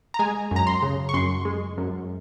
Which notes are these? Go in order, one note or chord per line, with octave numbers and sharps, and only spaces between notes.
A#5
G#3 G#5
F#2 A#5
C6
C#3
C#6
F#2 C6
G#3
F#2